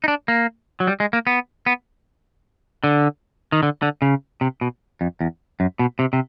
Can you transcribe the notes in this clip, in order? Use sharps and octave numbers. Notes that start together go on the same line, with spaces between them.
D#4
D4
A#3
F#3
G3
G#3
A#3
B3
B3
D3
D#3
D3
D3
C#3
C3
B2
F2
E2
F#2
B2
C3
C3